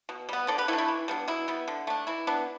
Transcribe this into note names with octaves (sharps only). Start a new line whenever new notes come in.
B2
G3 B3
D3 A4 D5
G4 B4
A3 D4 E4 A4
E4
E3
G3 B3 D4
B2 E4
G3 B3
D3
A3 D4
E3 E4
B3 D4